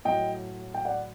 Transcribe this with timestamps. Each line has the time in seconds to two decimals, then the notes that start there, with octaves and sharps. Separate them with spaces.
0.05 A2 F#3 D#5 G5
0.74 G5
0.85 D5 F#5